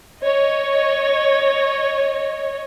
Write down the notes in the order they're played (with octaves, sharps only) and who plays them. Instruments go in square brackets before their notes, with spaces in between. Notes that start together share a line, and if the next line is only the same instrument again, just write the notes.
[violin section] C#5 D#5